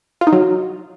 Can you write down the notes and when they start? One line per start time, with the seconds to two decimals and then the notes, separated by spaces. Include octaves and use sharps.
0.21 F4
0.27 D#4
0.33 F#3